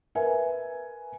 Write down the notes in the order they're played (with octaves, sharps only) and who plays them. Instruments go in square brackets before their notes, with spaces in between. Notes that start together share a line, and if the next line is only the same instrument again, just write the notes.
[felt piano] A#4 B4 E5 G#5